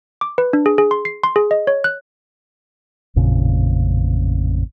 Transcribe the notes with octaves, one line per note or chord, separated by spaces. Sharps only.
D6
B4
D4
G#4
G#4
C6
C7
C6
G#4
D#5
C#5
F#6
A1 F2 A#2 C#3